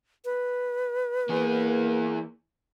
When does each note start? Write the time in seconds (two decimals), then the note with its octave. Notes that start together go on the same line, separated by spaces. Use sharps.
0.25 B4
1.29 E3 A#3 G#4